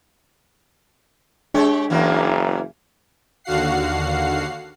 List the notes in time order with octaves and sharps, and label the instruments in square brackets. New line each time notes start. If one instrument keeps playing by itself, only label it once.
[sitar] G#3 G4 C#5 [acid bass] D4
[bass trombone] F#1 [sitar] E2 E3 A#3
[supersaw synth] D#2 D3 F#4 F5 F#5 C7